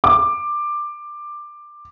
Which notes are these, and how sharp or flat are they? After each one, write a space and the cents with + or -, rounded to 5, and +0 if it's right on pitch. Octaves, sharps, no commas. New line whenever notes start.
D6 +10